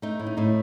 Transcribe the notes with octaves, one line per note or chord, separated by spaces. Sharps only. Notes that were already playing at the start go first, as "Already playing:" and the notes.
A3 D#4
A2
D#4
A2 D#4